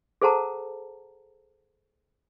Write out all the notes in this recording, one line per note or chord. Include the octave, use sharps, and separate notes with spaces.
G#4 A4 C5 F#5 A5 A#5